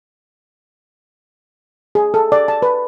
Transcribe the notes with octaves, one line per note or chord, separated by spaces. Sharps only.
G#4
A4
D5
A5
B4